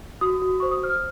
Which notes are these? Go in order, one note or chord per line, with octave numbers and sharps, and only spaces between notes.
F#4 D#6
F#4
C5 C#6
D#6
C5 F6